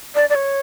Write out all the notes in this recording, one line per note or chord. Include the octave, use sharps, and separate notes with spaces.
D5
D5
C#5